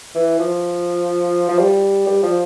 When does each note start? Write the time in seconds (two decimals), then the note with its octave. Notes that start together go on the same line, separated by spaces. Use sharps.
0.15 E3
0.39 F3
1.49 F3
1.59 G3
2.07 G3
2.23 F3